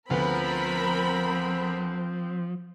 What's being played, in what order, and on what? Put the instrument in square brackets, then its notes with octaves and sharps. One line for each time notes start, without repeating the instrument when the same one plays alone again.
[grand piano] D2 B3 [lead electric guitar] F3 [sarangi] C4 [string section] A#4 B5